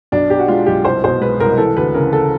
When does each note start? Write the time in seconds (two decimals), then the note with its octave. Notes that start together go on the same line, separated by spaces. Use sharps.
0.12 B1 D4
0.30 B2 G4
0.39 F#4
0.48 G#3 F4
0.66 B1 G4
0.85 C2 C5
1.04 B2 C5
1.21 G#3 B4
1.40 C2 A#4
1.58 E3 A4
1.77 D2 B4
1.94 C#3 A#4
2.13 A4